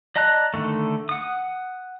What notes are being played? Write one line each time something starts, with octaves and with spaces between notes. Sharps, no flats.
D5 D#5 A5 A#5 F#6
D3 D#3 A3
F#5 D#6